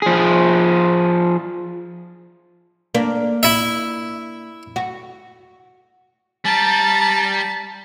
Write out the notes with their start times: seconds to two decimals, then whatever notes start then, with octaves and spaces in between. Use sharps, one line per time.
0.02 F3 G#4
2.94 A#3 D4
3.43 E4 E5
4.76 F#4
6.45 G3 A5 A#5